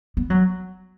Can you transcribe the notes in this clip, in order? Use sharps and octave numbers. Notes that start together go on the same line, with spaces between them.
B3
F#3